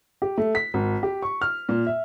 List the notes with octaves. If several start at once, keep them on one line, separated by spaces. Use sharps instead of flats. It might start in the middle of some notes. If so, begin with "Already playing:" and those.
G4
A3
B6
G#1
G4
C#6
F6
A#2
E5